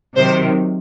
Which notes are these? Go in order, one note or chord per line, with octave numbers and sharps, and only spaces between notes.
C3 D#3 F#3 C5